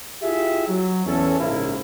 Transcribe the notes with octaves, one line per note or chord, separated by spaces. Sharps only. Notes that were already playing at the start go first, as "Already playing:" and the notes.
E4 F4 G4 G#4 E5
F#3
E2 C#4 A4
A#1 G#2 C#3 A#3 E4